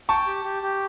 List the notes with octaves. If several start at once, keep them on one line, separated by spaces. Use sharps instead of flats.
G5 A5 C#6
G4
G4
G4